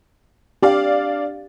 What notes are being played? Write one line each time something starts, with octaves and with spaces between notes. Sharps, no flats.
D4 G4 D5 F5